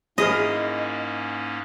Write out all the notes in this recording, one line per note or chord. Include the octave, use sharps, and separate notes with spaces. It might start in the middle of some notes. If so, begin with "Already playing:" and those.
G#2 A#3 C#4 E4 G#4 A#4 D#5